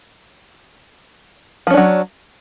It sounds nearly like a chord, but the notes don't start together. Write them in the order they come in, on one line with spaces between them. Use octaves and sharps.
F3 C#4 D4 F#3